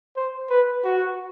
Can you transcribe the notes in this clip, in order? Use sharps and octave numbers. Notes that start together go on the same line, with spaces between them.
C5
B4
F#4